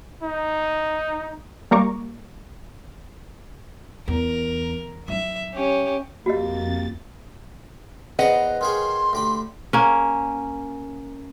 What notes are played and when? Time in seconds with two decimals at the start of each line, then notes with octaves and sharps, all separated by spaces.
0.23 D#4
1.71 G3 G#3 A#3 A#5 C#6 D6
4.08 E2 A#4
5.08 F#3 D#4 E5
5.54 C#4 G4
6.26 F2 A#3 F#4 G4 D#5 A6
8.19 E2 B4 C5 D#5 F#5 A#5
8.61 D#3 C#4 G#4 C6
9.13 D2 G4 B5
9.73 A#3 C#4